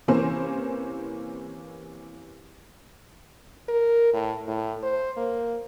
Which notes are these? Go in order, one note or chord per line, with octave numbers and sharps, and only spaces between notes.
C3 E3 A#3 C#4 C5
A#4
A2
A2
C5
A#3